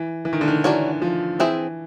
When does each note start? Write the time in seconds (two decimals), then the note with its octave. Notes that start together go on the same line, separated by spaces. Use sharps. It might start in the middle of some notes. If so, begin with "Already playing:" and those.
Already playing: E3
0.25 E3
0.33 D#3
0.41 D3
0.48 D#3
0.64 E3 D4 F#4 A#4 C#5
1.02 F3
1.39 E3 C4 E4 G#4 C5